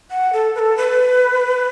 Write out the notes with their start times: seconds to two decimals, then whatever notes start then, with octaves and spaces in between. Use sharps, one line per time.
0.10 F#5
0.33 A4
0.55 B4
0.59 A4
0.77 B4